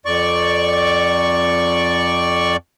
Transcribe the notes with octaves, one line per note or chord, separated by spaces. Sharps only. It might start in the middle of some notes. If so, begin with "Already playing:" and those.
F2 D5 C#6